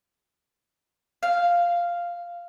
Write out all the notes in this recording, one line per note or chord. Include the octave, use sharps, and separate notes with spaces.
F5